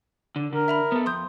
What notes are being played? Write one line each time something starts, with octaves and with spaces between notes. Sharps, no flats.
D3
D3 A#4
E5 A#5 B5
B3 A4
F2 C6 D#6 G6